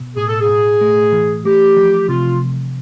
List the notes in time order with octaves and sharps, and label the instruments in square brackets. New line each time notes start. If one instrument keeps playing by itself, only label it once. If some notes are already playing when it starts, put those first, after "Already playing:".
Already playing: [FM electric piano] B2
[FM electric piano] A2 [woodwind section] G#4
[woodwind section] A4
G#4
[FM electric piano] A2
A3
E3
[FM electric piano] A3 [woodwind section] G4
[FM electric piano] F3
[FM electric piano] C3 [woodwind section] F4